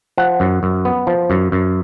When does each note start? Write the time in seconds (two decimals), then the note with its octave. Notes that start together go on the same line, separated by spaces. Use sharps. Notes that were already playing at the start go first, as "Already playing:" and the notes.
0.18 F3 F#5
0.40 F#2
0.63 F#2
0.85 B3
1.07 F3
1.30 F#2
1.52 F#2